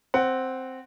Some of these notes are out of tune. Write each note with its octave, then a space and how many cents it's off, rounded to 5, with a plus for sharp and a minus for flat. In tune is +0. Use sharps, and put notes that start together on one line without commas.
C4 +0 F#5 +10